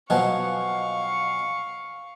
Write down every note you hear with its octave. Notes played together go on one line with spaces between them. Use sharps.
B2 F3 F#3 D#5 F5 F#5 G#5 C#6